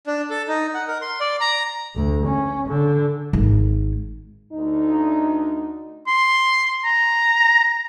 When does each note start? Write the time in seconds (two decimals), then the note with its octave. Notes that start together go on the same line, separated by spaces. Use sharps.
0.07 D4
0.30 A4
0.48 D#4
0.74 F#5
0.87 A#4
1.02 C6
1.20 D5
1.41 A#5
1.95 D2
2.27 C#4
2.68 D3
3.33 G#1
4.54 D2 D#4
6.07 C6
6.84 A#5